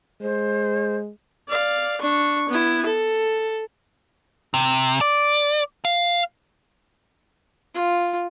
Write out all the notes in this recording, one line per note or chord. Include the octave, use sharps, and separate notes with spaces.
G#3 C5
D5 F5
D4 C#6
B3 E4
A4
C3
D5
F5
F4